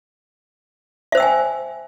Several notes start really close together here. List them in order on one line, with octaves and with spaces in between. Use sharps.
E5 C5 E6 G5 G#5